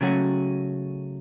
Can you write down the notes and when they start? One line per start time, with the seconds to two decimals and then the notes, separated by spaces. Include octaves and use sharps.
0.01 C#3 F#3 A3 C#4 F#4